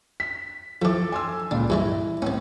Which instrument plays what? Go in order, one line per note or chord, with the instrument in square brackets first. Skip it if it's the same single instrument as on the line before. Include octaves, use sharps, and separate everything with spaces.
[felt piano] B6
[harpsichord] E3 F3 [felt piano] A4 D6
[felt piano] G#5 C6 E6
[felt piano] C#2 A#2 [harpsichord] D4
[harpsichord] G2 E3 G#3 [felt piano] E4
[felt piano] A2 [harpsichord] B3 C#4